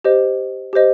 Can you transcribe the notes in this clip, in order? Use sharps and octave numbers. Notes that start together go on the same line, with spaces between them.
G4 C5 D#5
G4 C5 D#5